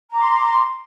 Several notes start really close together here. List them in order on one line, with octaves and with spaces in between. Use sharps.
A#5 D6 C6